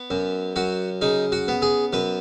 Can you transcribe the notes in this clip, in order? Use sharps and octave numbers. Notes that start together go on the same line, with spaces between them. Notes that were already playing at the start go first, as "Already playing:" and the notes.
Already playing: B3
F#2
F#2 F#4
C#3 D#4
F#4
B3
G#4
F#2 B4